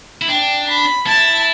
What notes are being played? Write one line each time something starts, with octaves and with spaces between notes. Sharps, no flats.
E4
D4 G5
B5
E4 A5